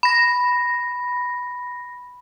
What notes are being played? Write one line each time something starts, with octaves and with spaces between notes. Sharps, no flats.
B5 A#6